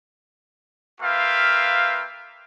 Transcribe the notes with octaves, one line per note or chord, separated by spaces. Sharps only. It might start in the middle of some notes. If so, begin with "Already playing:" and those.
A#3 F4 B4 E5 F5 G5